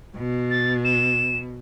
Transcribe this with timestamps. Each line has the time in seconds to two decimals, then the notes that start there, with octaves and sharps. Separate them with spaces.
0.17 B2
0.51 A6
0.85 E7